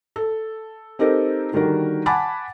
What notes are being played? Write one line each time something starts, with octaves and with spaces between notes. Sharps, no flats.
A4
C4 D#4 G4 A4 A#4
D3 D#3 G3 F#4 A#4
F#5 G#5 A5 B5 D6 A6